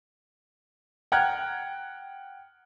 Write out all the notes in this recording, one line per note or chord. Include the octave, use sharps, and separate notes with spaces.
F#5 G5 A#5 F6 F#6 G#6